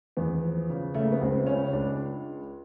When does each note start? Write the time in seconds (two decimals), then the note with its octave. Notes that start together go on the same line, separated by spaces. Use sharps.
0.17 E2 B3
0.43 F3
0.70 C#3
0.94 C#3 A3
1.03 A#3
1.12 B3
1.21 C#2 C4
1.46 C#3 C#4
1.73 C#2 D4